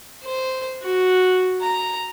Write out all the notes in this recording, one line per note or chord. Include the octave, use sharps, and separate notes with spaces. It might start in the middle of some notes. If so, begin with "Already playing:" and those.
C5
F#4
A#5